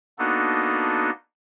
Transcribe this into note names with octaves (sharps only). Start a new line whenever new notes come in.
A#3 B3 D4 D#4 F#4 A4